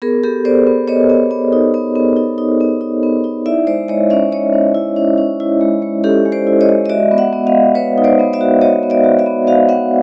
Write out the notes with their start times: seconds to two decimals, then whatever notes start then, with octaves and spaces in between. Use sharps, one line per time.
0.02 B3 G#4 A#4
0.24 B3 G4 A4
0.45 B3 C5 D5
0.67 B3
0.88 B3 C#5 D#5
1.10 B3
1.31 B3
1.53 D#4
1.74 B3
1.96 B3
2.17 D#4
2.38 D#4
2.61 B3
2.81 D#4
3.03 B3
3.24 D#4
3.46 E4 D5 E5
3.67 G#3 C5 D5
3.88 G#3 C#5 D#5
4.10 C#4 D5 E5
4.32 G#3 C#5 D#5
4.53 C#4
4.75 E4
4.96 C#4
5.18 C#4
5.40 E4
5.61 G#3
5.82 G#3
6.04 C#4 G4 A4
6.26 G#3
6.32 C5 D5
6.47 E4
6.61 C#5 D#5
6.69 G#3
6.86 D#5
6.89 F#4 D5 E5
7.11 B3
7.18 E5 F#5
7.33 B3
7.47 D#5 F5
7.54 B3
7.75 B3 B4 C#5
7.98 D#4
8.04 C5 D5
8.19 B3
8.33 D5 E5
8.41 F#4
8.61 F#4 C#5 D#5
8.83 B3
8.90 D5 E5
9.04 F#4
9.19 D5 E5
9.26 B3
9.47 F#4 D#5 F5
9.69 B3 E5 F#5